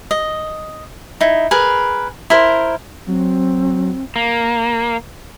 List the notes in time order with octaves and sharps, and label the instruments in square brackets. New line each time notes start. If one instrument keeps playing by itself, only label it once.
[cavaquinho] D#5
D#4 E4
G#4 A#4 B4
E4 A#4 C5
[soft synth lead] F#3 [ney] C4
[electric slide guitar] A#3